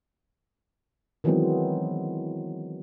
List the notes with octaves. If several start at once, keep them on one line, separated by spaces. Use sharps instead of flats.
D#3 E3 F#3 G#3 B3 C4